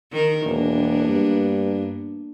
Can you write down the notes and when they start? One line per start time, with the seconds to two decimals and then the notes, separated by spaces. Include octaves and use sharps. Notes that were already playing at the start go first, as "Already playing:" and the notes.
0.12 D#3 A#4
0.45 E1 A#3 B3 D4
1.09 G2